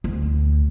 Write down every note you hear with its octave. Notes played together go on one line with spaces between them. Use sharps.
D2